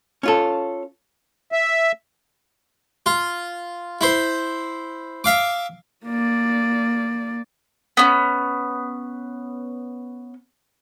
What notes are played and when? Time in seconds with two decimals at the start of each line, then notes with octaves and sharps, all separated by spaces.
0.23 C#4 F4 A4
1.52 E5
3.06 F4
4.01 E4 C5
5.24 E5 F5 D6
6.06 A#3 D5
7.97 B3 C#4